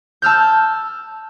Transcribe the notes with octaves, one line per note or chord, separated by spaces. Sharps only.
A5 E6 F6 G6